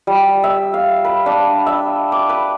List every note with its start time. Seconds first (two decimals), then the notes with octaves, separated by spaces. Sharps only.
0.07 G3
0.44 E5
0.74 F5
1.05 B4
1.26 D4
1.66 E5
2.12 D6
2.29 B4